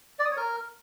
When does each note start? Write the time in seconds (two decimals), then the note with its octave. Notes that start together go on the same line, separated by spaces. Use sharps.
0.19 D5
0.25 D#6
0.31 C#5
0.37 A#4